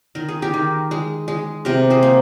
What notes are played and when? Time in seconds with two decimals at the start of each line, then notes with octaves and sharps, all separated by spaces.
0.15 D#3 A#4
0.28 G#4
0.42 G4 A#4
0.54 D#3
0.91 G#3
1.28 G#3
1.65 C3 G4 A#4
1.90 G#4 C5
2.03 A#3